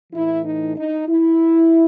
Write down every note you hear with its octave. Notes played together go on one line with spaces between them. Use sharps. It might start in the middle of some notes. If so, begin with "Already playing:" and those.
A2 E3 E4
D#4
D#4
E4